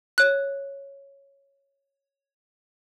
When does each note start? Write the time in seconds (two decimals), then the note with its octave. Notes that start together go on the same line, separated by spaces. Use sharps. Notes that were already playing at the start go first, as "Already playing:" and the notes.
0.18 C#5 F#6